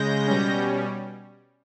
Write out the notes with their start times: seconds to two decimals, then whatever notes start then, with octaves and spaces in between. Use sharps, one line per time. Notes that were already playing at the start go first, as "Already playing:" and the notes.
Already playing: C#3 G#3 G6 A#6
0.27 B2 G3 C#4